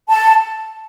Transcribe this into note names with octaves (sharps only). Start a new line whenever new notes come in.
A5